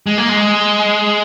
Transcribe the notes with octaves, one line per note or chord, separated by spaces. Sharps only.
G#3
A#3
G#3